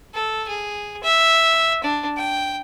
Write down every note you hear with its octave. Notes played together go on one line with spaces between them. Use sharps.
A4
G#4
E5
D4
G5